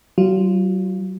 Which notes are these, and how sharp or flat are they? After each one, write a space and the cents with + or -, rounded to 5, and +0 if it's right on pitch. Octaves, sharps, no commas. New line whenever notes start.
F#3 +35 F4 -10